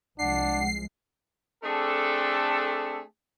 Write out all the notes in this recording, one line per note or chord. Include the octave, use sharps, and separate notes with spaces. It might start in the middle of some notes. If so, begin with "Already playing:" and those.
C2 F3 G#3 D4 F#5 C7
A3 C4 D4 G#4 A4